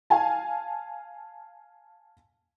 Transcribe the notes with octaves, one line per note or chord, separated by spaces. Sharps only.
F5 G#5 A5